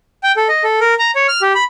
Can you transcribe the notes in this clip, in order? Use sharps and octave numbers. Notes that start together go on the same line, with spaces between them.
G5
A4
D#5
A4
A#4
A#5
C#5
F6
G4
B5